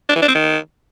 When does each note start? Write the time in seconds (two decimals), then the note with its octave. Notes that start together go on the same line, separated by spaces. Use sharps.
0.09 D4
0.16 E3
0.22 D4
0.28 C4
0.35 D#3